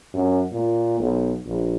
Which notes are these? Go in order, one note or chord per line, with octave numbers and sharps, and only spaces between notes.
F#2
A#2
B1
A#1